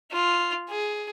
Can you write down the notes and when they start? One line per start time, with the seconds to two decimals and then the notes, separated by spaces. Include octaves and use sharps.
0.12 F4
0.69 G#4